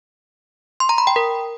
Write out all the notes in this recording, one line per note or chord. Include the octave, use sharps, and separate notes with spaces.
C6
A#5
B5
G5
A#4